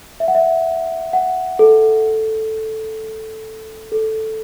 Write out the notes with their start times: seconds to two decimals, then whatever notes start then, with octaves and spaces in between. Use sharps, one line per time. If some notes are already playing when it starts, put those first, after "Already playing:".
0.20 E5
0.28 F#5
0.35 E5
1.13 F#5
1.59 A4
3.92 A4